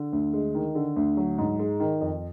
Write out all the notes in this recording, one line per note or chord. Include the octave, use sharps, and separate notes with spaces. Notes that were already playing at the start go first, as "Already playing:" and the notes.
Already playing: D3
D2
G#3
D#3
D3
D2
F#3
G#2
G#3
D#3
F2